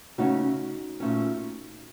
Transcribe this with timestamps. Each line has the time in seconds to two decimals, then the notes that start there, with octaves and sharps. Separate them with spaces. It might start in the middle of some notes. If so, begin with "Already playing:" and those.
0.18 C#3 A3 C#4 D#4 F#4
1.00 A#2 A3 C#4